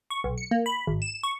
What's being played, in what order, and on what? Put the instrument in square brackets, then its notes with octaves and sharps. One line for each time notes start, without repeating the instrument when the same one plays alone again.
[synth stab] C#6
B1
C#7
A#3
B5
G#1
E7
C#6